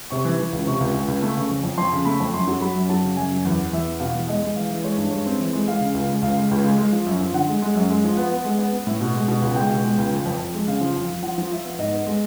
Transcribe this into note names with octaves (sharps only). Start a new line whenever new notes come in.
C3 C#6
E3
E3
C#2
C3 C#6
C#2
C#2
C#2
A3
C#3
F2
F2
F2 C6
C#3
A3 B5
F2
F#2 C6
F#3
F#3 B5
F#2
F#3 A5
C#3
F#2 G#5
F#2
E2
B3
E2 E5
B3
B2 F5
E2
G#3 D#5
G#3
E3 F5
E3
G#3 C#5
G2
G#3 C#5
C4
E3
G#3
G#3 F5
C#3
C#2
G#3
C#2 F5
G#3
C#2
G#3
G#3
F3
F#2
F3
D3 F#5
G#3
G#3
F#2
G#3
F3
B3
B3
G#3
B3
B3
A2
B2
G#3
B2
C#2
G#3 G5
B2
G#3
C#2
F3
F2
F2
G#3
C#3 F5
F3
F2
F3
F3 F#5
F3
F3 E5
B3
G#2 D#5
B3
G#3